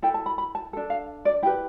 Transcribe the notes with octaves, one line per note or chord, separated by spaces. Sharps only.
E4 A4 G5
A5
B5
B5
A5
D4 A4
F5
D5
E4 G4 B4 G5